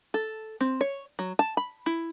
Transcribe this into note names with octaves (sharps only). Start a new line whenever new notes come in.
A4
C4
C#5
F#3
A5
B5
E4